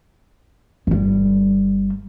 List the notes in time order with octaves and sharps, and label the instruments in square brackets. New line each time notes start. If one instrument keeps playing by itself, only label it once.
[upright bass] G1 G3